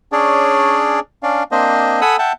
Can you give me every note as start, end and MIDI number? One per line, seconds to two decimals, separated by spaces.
0.12 1.00 61
0.12 1.00 62
0.12 1.00 68
0.12 1.00 73
0.12 1.00 74
1.23 1.43 61
1.23 1.43 62
1.23 1.43 74
1.23 1.43 77
1.52 2.01 58
1.52 2.01 60
1.52 2.01 62
1.52 2.01 72
1.52 2.01 75
2.01 2.17 69
2.01 2.17 78
2.01 2.17 80
2.01 2.17 83
2.01 2.17 87
2.01 2.17 88
2.19 2.32 76
2.19 2.32 78
2.19 2.32 79
2.19 2.32 81